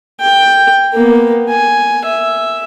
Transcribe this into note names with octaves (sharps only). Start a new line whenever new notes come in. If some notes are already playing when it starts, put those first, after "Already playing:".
G5
A#3 B3
G#5
E5